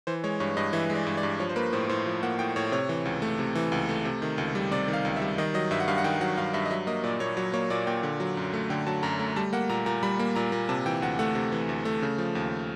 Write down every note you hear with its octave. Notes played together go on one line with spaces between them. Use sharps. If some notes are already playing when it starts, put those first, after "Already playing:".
E3 C5
G#3 C#5
G2 C#5
G2 D#5
E3 E5
G#3
D5
G2
D5
G2
F3 C#5
C5
A#3 B4
A2 C5
A2 C5
F3
A#3 F#5
A2 G5
A2 C#5
C3 C#5
E3
C#2
A3
C3
E3
C#2
A3
C3
D#3
C#2
G3
C3 D5
D#3
F5
C#2
E5
G3
D#3 D#5
F#3 D#5
G2 E5
F#5
G2 F5
F#5
D#3 G5
F#3 F#5
G2 F5
G2 E5
D#5
F#3 E5
A#3 D#5
A#2 D5
A#2 C#5
F#3 C#5
A#3 C#5
A#2 D5
A#2 G5
D3
F#3
F#2
A3
D3 G5
F#3 A5
F#2 A#5
A3
G3 A5
A#3 F#5
A#2 A#5
A#2 A#5
G3 B5
A#3
A#2 A#5
A#2
C3 A5
E3 G5
D2 F#5
A3 F#5
C3
E3
D2
A3
C#3
F3
D#2